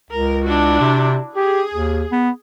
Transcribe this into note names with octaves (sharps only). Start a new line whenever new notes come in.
C#2 A#4
D4 E4 F#4
C3
G4 G#4
D#2
B3